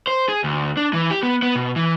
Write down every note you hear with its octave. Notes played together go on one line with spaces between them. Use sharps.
C5
G#4
D2
D4
E3
G4
B3
B3
B2
E3